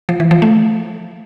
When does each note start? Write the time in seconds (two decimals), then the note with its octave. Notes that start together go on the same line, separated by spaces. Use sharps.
0.09 F3
0.20 E3
0.31 F3
0.42 A3